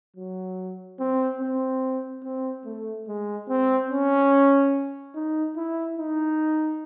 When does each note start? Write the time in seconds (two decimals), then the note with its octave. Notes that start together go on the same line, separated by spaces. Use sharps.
0.16 F#3
0.99 C4
1.41 C4
2.24 C4
2.65 A3
3.08 G#3
3.49 C4
3.90 C#4
5.15 D#4
5.56 E4
5.99 D#4